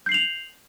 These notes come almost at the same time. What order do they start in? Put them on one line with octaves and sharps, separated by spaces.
G6 C7 F#7 F7